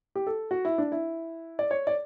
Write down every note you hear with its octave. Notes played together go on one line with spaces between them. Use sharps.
G4
A4
F#4
E4
D4
E4
D5
C#5
D5